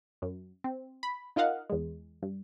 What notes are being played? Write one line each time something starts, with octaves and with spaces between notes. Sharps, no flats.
F#2
C4
B5
D#4 F4 A#4 D#5 F5 F#5
E2 G#3
G2